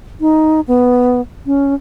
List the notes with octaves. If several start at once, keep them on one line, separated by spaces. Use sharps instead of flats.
D#4
B3
C#4